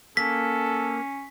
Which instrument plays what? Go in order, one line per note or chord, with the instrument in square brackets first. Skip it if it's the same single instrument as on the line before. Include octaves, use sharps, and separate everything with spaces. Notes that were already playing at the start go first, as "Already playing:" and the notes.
[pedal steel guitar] A#3 [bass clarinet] C#4 [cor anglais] A4 [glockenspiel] B6